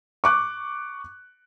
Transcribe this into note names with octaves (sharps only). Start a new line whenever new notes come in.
C#6 D6 F#6